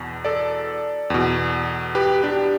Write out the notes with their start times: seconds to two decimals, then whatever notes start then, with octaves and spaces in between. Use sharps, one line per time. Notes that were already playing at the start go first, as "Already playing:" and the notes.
Already playing: E2 B2
0.25 A4 D5
1.10 E2 B2
1.95 G4 B4
2.23 D4 G4